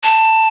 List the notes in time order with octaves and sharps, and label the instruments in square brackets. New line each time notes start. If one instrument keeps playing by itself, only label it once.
[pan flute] A5